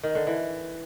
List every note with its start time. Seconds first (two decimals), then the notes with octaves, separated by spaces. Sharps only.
0.03 D#3
0.15 D3
0.27 E3